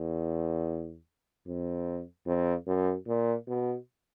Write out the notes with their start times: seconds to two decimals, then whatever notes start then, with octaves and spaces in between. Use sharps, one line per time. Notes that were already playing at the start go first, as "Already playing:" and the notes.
Already playing: E2
1.47 F2
2.26 F2
2.67 F#2
3.07 A#2
3.47 B2